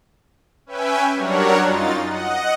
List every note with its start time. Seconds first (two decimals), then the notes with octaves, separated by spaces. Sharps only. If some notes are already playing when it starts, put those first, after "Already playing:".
0.66 C#4 B4 E5 G5 G#5
1.14 F#3 G3 D4 A#4 C#5 F#5
1.64 F#2 D#4 F4 A6
2.04 D#5 F#5